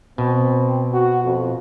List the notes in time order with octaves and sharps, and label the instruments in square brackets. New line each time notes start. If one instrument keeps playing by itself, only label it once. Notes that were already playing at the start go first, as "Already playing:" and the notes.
[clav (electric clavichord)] B2 [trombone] C4
[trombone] F#4
F2